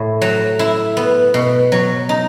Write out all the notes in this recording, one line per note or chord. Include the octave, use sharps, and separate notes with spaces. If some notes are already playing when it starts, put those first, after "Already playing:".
Already playing: A2 A3
F#3
E4
B3
B2
F#3
D#4